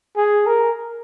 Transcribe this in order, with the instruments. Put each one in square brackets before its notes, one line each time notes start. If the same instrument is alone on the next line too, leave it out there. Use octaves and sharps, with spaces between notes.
[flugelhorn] G#4
A#4